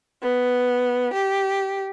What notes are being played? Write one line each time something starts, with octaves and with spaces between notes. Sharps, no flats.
B3
G4